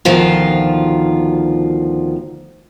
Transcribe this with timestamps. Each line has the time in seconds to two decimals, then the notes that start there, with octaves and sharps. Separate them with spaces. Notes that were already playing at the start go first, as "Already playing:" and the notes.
0.05 D2 B2 D#3 F3 F4